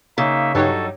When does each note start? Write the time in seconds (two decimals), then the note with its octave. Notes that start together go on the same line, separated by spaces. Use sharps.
0.18 C#3 A#3 D#4 E5
0.55 G2 F#3 D#4 G4 A4 C#5